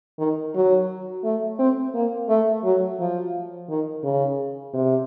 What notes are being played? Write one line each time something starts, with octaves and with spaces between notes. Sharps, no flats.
D#3
F#3
A3
C4
A#3
A3
F#3
F3
D#3
C#3
C3